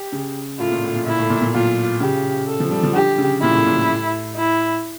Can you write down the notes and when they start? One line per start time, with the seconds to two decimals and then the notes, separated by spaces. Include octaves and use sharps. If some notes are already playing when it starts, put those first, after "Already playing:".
Already playing: G4
0.12 C#3
0.59 A2 F4
0.71 A#2
0.83 A2
0.95 A#2
1.06 A#2 E4
1.19 A2
1.30 A#2
1.41 A#2
1.54 A#2 F4
2.00 C#3 G4
2.48 A4
2.60 F3
2.71 G3
2.83 F3
2.95 D3 G4
3.18 C#3
3.42 A#2 E4
3.54 A2
3.66 A#2
3.78 A2
4.37 E4